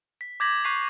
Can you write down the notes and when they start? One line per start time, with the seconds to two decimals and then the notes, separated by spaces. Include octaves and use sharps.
0.21 B6
0.40 D6 G6 G#6 A#6 B6 F#7
0.64 C#6 F#6 G6 B6 C7 F7